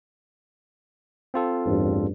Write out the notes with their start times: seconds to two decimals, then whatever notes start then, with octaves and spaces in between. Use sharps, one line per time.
1.34 C4 F4 A4
1.66 A1 E2 G2